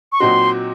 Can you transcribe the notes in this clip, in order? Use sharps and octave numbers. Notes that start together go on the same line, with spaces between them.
C#6
A#2 F#3 C4 D#4 F#4 C6